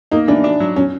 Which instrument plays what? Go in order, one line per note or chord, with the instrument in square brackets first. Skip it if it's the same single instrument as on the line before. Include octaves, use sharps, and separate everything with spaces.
[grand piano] A#3 [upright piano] D#4
[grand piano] E3 [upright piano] D4
[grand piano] D4
F#3
[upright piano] C#4